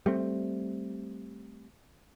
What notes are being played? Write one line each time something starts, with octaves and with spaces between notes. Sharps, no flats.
G3 A3 C4